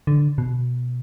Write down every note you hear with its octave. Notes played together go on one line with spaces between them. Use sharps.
D3
B2